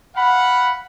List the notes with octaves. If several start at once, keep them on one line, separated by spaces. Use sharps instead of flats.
F5 F#5 B5